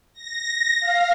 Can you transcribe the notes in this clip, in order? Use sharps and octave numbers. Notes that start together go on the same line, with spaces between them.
A#6
F5